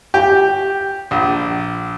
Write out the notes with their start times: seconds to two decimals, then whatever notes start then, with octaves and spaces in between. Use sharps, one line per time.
0.14 G4
1.11 A#1